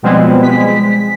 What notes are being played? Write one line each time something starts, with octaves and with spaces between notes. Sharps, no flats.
B2 F3 G3 G#3 B3 C4
G#3 B6